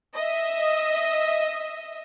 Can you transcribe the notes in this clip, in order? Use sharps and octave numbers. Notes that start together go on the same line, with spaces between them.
D#5 E5